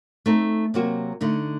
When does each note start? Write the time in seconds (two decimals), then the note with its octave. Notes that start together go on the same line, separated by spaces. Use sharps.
0.26 A3 C4 D#4 A4
0.74 C3 F#3 A#3 F#4
1.21 D3 A3 D#4